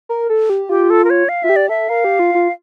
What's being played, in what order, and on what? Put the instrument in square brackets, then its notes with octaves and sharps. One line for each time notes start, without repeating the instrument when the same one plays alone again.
[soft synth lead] A#4
A4
G4
[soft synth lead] F4 [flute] G4
[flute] A4
A#4
C#5
F5
[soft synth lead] F4 [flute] E5
[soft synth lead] G4
[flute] D5
[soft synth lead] A4 [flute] E5
[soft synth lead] A#4 [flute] F5
[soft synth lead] G4
F4
F4